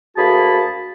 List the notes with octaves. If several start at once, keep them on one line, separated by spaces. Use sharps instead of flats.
D2 A#3 F#4 G#4 A5 B5